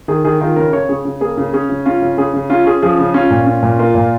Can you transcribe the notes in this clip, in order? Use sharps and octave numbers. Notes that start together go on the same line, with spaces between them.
D#3 G#4
D#3 G#4
D#3 F4
C#3 A#4
C#3 C#5
C#3 G#4
C#3
A#3 G#4
C#3
C#4 G#4
C#3
C#4 F4
C#3
C#3 G#4
C#3
C#4 F4
C#4 G#4
F3 G#4
C#3
C#4 F4
A#2
C#4
A#2
A#3 F4
A#2